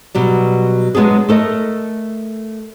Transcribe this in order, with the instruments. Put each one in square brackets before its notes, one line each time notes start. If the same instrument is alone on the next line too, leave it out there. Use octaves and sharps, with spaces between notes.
[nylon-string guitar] B2 F#3 G3
F#3 G#3 B3 D4 G#4
A3 A4 A#4 D#5